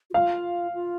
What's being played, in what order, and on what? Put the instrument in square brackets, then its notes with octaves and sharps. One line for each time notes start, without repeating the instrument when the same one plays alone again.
[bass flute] F#4
[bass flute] F4 [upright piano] F5
[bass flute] F4